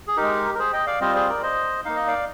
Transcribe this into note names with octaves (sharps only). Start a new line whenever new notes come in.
G#4
G#3 D#4 G4 A#4
A#4
G#4 C5
D#5 G5
D5 F5
G3 C4 F4 C5 D#5
G#4 C5
A#4 D5
C5 D#5
A#3 D#4 F5
D#5
D5 F5